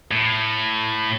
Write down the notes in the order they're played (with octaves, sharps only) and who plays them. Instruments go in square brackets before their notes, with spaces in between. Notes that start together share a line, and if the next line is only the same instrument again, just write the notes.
[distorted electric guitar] A2